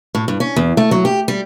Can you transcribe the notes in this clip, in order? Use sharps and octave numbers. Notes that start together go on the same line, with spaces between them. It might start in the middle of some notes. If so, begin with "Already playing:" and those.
A2
G2
C#4
E2
A3
F#3
G4
G3